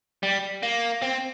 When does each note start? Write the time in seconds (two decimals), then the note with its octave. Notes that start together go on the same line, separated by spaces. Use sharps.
0.23 G3
0.63 A#3
1.02 C4